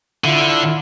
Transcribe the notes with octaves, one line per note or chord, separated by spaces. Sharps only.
D3 E4 F4